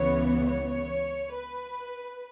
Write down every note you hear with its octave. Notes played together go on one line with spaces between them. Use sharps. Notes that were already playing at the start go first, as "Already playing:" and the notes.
Already playing: C#2 C#3 E3 B3 C#5
C#5
B4